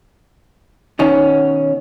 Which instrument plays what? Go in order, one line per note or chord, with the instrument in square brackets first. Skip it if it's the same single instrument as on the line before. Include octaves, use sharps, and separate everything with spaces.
[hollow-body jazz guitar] B2 D#3 C#4